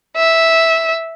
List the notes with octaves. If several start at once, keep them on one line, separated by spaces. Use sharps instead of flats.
E5